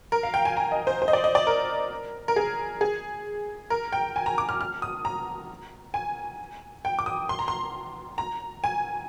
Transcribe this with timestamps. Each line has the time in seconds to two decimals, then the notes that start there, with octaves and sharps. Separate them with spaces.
0.12 A#4
0.23 F5
0.34 G5
0.45 G#5
0.57 A#5
0.72 D#5
0.87 C5
1.02 C5
1.08 D#5
1.13 D5
1.24 D#5
1.35 D5
1.47 A#4
2.28 A#4
2.36 G#4
2.81 G#4
3.70 A#4
3.92 G5
4.16 G#5
4.26 A#5
4.38 D6
4.49 F6
4.61 F6
4.82 D#6
5.05 A#5
5.94 G#5
6.85 G5
6.99 D6
7.06 D#6
7.29 C6
7.39 A#5
7.48 C6
8.18 A#5
8.64 G#5